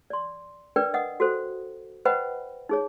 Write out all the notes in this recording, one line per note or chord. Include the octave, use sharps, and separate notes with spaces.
D5 C6
D4 A#4 B4 D5 G5
D#5 F#5 D#6
F#4 A4 C5
B4 C5 D#5 F#5 G5 B5
D#4 G#4 C#5